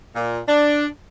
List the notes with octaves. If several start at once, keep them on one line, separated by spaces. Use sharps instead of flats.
A#2
D4